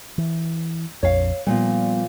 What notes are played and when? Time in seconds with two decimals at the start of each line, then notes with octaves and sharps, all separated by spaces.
0.18 E3
1.03 A#1 F2 C#5 F5
1.47 A#2 F3 G3 B3